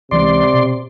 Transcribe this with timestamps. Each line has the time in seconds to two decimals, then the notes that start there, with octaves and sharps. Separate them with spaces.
0.11 C#2 C3 E3 G#3 D5 C6
0.53 B2